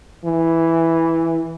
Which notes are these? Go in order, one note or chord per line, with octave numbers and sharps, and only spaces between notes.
E3